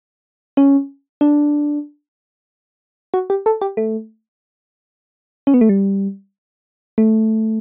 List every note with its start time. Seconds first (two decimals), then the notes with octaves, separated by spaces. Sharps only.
0.57 C#4
1.21 D4
3.14 F#4
3.30 G4
3.46 A4
3.61 G4
3.77 A3
5.47 C#4
5.54 B3
5.61 A3
5.69 G3
6.98 A3